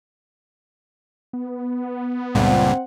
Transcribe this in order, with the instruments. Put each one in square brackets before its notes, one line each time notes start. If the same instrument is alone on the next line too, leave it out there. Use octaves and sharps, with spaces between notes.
[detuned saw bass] B3
[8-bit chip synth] C#2 G2 A#2 [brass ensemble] C4 F#5